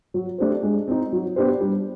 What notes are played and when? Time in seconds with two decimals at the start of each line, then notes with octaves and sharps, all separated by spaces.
0.14 F#3
0.38 A3 D4 G4 C5
0.63 G#3
0.88 C4 D#4
1.12 F#3
1.36 B3 D4 G4 C5
1.61 G3